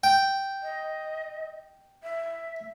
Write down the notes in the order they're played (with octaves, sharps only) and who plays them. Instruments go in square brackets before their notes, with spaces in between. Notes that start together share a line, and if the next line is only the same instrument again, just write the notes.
[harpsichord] G5
[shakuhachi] D#5
E5